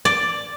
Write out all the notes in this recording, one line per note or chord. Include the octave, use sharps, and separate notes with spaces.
D5